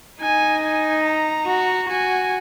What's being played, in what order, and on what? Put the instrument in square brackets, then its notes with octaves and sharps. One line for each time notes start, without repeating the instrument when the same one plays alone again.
[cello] D#4 [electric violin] G#5
[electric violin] G#5
A#5
[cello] F#4
[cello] F#4 [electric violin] G#5